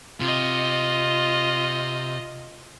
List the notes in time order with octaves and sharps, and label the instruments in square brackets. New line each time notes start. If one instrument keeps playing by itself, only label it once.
[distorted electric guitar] C3 [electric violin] F4 D#5